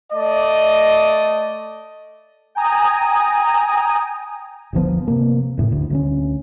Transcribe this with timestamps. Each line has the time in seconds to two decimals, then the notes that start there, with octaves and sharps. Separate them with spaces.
0.13 A3 D5 D#5
2.55 G5 G#5 A#5 D#6
4.73 G1 D2 F3 B3
5.08 C3 A#3
5.57 F1 A2 C#3
5.72 D2
5.90 D2 F#3 C#4